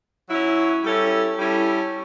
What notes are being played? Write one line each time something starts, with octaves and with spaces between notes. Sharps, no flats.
F#3 C#4 E4
G3 C#4 E4 A4
G3 C#4 E4 A4